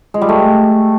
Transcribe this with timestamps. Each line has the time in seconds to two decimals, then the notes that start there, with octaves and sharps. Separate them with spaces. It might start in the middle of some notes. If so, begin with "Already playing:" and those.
0.14 G#3
0.21 G3
0.29 A3